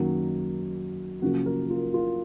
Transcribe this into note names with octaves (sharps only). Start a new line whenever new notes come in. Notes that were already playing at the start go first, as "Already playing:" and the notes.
Already playing: F#2 D#3 F#3 A#3
F#2 C#3 F3 A#3 F#4
A#4
F4
F4